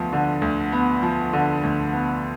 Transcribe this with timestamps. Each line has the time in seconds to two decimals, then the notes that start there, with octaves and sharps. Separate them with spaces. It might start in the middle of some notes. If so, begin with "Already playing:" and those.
Already playing: D2 F3 B3
0.13 D3
0.42 D2
0.72 B3
1.03 F3
1.33 D3
1.63 D2
1.93 B3